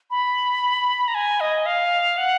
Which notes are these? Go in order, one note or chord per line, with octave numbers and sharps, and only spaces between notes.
B5
A#5
G#5
D#5
F5
F#5